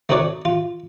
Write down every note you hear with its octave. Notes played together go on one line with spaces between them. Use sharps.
A3 C4 D#4 F#4 C#5 D5
F4